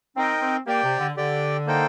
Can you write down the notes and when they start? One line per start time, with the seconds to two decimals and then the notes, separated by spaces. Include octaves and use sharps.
0.17 C4 D#4 A#4 D#5 G5
0.41 C4
0.67 A#3 G4 D5 G5
0.83 C3
1.00 D3
1.17 D3 G4 D5 G5
1.66 A#3 D#4 A4 C5 G5